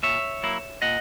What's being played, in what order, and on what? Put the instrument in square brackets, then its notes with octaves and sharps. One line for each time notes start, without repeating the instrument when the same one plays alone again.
[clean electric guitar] A#2 C#5 E5
F#3 A#3 E4
A#2 D#5 F#5